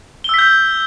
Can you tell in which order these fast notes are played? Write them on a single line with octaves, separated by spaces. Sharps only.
G7 E6 B6 G6